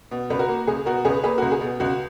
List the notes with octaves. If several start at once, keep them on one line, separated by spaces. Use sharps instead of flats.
B2
C#2 B4
F#4 A#4
A#3
C#2 G#4
B2 F#4 A#4
C#2 G#4 B4
A#3 G#4 B4
C#2 F#4 A#4
G#4
B2
C#2 F#4